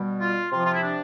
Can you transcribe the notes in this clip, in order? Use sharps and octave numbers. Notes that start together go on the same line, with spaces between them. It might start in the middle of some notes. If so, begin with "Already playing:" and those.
Already playing: B2 G3
F4
C3 F3 F4
F4
E4
D4